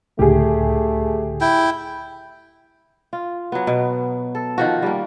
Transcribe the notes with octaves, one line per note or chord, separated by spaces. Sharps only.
C#2 A2 D3 A3 G4 G#4
E4 G5
F4
F#3 B3
B2
A4
D#3 F3 F#4
G3 A#3